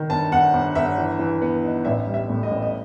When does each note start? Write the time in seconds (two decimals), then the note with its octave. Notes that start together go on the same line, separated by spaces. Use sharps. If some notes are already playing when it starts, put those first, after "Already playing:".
Already playing: D#3
0.10 G1 A5
0.32 G1 F#5
0.53 G1
0.75 G1 E5
0.98 E3
1.19 E3
1.42 B3
1.64 D#4
1.85 A1 E5
2.07 G3
2.14 E5
2.29 A2
2.43 D#5
2.50 A1
2.62 D#5